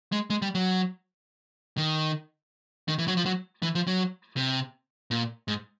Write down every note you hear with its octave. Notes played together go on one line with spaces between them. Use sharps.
G#3
G#3
G3
F#3
D#3
D#3
E3
F#3
F3
F#3
E3
F3
F#3
C3
A#2
G#2